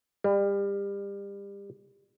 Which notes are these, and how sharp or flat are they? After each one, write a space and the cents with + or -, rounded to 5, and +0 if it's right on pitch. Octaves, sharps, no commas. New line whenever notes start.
G3 +30